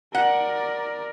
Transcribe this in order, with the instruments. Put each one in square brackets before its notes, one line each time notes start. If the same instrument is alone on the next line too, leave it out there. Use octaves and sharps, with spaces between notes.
[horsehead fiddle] A#4 D5 [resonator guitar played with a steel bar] F#5